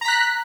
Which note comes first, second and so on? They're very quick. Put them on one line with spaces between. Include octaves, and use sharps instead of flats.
A#5 B6 F#6